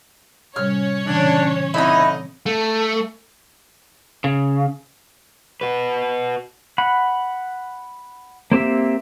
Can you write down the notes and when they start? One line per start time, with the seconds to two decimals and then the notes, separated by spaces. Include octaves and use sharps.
0.56 A2 C3 G3 C#4 C#5 F6
1.06 A#2 C#3 E3 D4
1.74 D3 C4 D#4 E4 D#5 B5
2.46 A3
4.24 C#3
5.61 F#4 B4
6.78 F#5 B5
8.52 A#3 C4 G4 E5